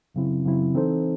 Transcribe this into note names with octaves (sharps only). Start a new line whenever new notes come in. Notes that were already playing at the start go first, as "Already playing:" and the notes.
F#2 C#3 F#3 C4 E4
F#2 C#3 F#3 C4 E4
E3 C4 D#4 A4 C5